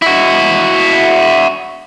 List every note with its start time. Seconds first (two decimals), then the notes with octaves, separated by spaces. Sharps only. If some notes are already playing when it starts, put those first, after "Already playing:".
0.02 E4 F#4